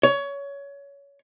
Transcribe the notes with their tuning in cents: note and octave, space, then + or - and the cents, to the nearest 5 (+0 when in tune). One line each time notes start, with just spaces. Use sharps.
C#5 +20